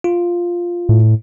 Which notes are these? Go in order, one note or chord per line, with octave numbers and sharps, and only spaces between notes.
F4
A2